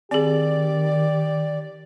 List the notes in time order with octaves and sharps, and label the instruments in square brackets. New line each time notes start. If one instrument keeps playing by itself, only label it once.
[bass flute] D#3 [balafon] C4 G#4 [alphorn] G4 [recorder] D5